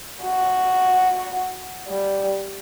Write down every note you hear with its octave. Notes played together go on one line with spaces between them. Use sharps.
F#4
G3